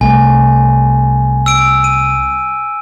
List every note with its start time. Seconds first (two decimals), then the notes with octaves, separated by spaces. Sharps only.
0.01 C2 A3 G#5
1.46 E6 D7
1.84 D#7